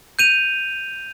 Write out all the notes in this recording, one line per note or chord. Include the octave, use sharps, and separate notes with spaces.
G6 D#7 F7